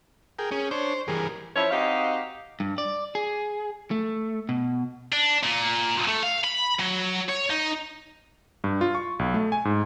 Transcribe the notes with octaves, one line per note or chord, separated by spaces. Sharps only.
G#4 A#4 G5
C#4 G#4
D4 C5 C#5
G2 E3 G3 G#4 A#4
F3 E4 C#5
C4 D#4 F#4 G4 D#5 F5
G2
D5
G#4
A3
B2
D4
A#2
A3
F5
B5
F#3
C#5
D#4
G2
F4
C#6
B1
A3
G#5
G#2